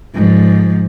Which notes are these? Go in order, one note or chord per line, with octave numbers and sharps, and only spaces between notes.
G#2 F3